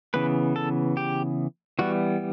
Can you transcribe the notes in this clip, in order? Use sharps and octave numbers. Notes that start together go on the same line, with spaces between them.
C#3 E3 B3 B4
A4
G4
E3 G3 B3 F#4